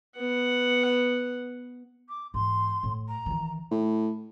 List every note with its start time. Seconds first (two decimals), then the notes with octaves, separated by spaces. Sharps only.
0.18 B3 F#5
2.09 D6
2.34 G#2 E3 C6
2.83 A2
3.08 A#5
3.26 D#3 E3
3.71 A2